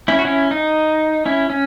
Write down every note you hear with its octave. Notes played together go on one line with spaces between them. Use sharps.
C#4 E4
F#4
C#4 E4
D#4
C#4 E4
C#4